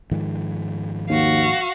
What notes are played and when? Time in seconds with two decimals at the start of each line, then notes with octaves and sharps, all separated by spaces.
0.11 G#2 D#3 F3
1.09 D#2 F#4 F5